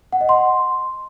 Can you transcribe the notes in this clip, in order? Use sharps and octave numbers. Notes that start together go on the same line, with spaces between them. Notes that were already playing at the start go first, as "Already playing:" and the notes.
F#5
D#5
C6